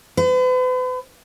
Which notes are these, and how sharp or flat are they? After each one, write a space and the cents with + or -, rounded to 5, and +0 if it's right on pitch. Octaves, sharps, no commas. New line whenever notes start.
B4 +45